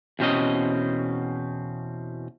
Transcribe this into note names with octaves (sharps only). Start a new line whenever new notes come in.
E2 B2 C4 C#4 D#5